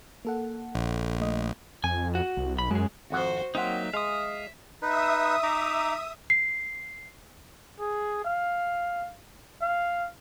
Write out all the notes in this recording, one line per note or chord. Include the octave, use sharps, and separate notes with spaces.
A#3 A4 F#5
A#1
A3 D#5
F2 G#5
F#4
C2
B1 B5
F#2 G#3 G#4
G#1 F2 F#4 C5 F#5
F#3 A#3 C4 D#4 E5 F#5
G#3 F5 D#6
D#4 B4 E5 D#6
D#4 A#5 D6
C7
G#4
F5
F5